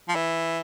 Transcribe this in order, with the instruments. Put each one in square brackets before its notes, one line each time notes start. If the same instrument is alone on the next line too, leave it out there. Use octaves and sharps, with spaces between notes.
[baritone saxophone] F3
E3